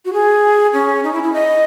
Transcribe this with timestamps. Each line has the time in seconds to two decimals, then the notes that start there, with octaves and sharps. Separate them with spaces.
0.05 F#4
0.13 G#4
0.73 C#4
1.04 D#4
1.13 E4
1.23 E4
1.33 D#5